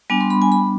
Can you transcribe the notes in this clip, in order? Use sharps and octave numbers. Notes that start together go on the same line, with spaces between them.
G3 B3 D4 G#5
C6
B5
G#5
B5